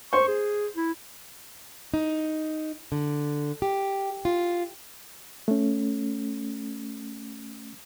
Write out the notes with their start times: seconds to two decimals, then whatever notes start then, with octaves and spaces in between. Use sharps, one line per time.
0.13 C5 C#6
0.28 G#4
0.77 E4
1.94 D#4
2.92 D3
3.62 G4
4.25 F4
5.48 A3 C#4